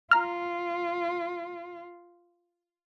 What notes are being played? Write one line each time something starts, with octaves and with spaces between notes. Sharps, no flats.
F4 A#5 F6